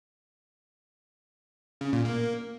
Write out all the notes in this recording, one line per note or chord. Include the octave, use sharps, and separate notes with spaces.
C#3
A#2
A#3